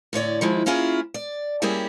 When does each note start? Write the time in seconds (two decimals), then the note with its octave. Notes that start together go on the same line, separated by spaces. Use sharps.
0.13 A2 D3 C#5 D5
0.41 D#3 F3 G#3 E4
0.66 A#3 C#4 E4 F4 G#4
1.14 D5
1.62 G3 A#3 C#4 E4 G4 G#4